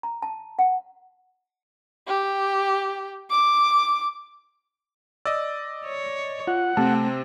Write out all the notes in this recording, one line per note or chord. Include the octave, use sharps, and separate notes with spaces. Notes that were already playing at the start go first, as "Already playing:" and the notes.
A#5
A5
F#5
G4
D6
D5 D#5 E6
C#5
F4 F#5
C3 A3 C4 A5